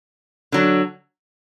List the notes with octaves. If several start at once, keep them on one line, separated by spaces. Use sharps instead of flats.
D3 F#3 D4